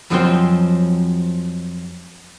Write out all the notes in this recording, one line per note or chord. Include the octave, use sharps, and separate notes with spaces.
F2 F3 F#3 G#3 C4 C5